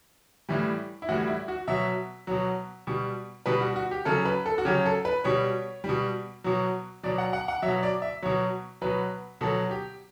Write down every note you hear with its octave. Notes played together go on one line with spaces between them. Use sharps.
A2 E3 G3
E4
A2 E3 G3 F#4
E4
F#4
B2 F#3 E5
B2 F#3
B2 G3
B2 G3 B4
F#4
F#4
G4
C#3 F#3 A4
B4
A4
F#4
C#3 F#3 G4
A4
B4
B2 G3 C#5
B2 G3
B2 F#3
B2 F#3 D5
F#5
F#5
F#5
B2 F#3 E5
D5
E5
B2 F#3 C#5
B2 F#3 B4
B2 F#3 A4
G4